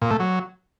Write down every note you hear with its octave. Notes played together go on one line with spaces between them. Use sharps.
A#2
A3
F#3